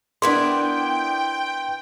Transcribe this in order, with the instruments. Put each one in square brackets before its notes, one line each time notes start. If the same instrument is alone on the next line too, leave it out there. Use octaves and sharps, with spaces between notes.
[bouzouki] B3 E4 D5 [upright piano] D4 A#4 [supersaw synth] G5 [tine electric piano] C6